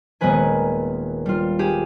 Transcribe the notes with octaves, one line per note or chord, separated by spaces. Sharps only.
D#1 G#3 A#3 B3 B4 G#5
G3 F4
G4 G#4